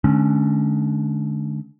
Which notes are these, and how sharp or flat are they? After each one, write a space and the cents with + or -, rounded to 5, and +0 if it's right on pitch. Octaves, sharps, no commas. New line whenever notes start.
D3 +15 G#3 +40 C#4 +0